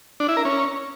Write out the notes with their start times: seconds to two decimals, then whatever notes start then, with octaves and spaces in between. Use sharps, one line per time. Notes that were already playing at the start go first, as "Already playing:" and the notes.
0.20 D4
0.28 E4
0.37 A#4
0.45 C#4